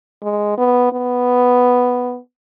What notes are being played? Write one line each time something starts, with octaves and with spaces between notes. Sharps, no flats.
G#3
B3
B3